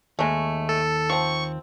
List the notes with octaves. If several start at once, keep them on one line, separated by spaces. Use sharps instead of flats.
D#2 G#3 A3
A4
F3 C4 C#6